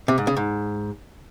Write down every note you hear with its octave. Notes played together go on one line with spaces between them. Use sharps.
C3
G#2
C#3
G#2